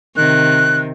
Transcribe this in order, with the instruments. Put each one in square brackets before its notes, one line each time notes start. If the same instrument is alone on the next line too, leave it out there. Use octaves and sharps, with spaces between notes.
[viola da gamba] C3 D#3 [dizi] F#6